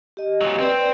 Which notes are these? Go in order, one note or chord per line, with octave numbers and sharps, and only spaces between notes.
G4 D#5
A#2 F#3
C4 B4 D5